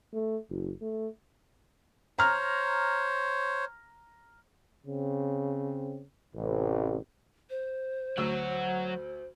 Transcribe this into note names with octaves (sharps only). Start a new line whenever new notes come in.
A3
F#1
A3
C5 C#5 A#5 F6
C#3 C4
A1 C3
C5
D2 F#3 F#4 E6